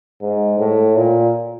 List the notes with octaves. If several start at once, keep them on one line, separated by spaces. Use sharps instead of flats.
G#2
A2
A#2